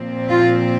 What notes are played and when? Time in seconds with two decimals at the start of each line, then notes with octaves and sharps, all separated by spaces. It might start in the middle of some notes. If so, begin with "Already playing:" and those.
Already playing: A#2 F3 C4
0.30 F4